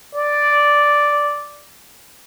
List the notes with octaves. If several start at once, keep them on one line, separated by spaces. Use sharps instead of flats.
D5